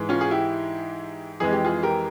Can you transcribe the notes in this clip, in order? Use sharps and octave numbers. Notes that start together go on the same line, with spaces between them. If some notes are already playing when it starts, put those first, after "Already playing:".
Already playing: G#2 E3 G#3
C#4 F4
G#4
E4 G4
F2 E3 G#3 G#4
G4
F4 G#4
G4 A#4